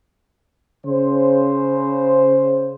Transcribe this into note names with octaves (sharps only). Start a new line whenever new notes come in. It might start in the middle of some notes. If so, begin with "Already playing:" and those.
C#3 C5